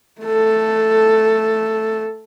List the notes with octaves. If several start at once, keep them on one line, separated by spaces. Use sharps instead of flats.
A3 A4